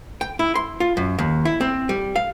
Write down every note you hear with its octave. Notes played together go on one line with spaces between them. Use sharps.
G5
E4
C6
F4
F#2
D#2
E4
C4
G3
F5